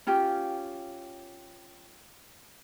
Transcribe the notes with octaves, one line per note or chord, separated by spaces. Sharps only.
C#4 F4 G4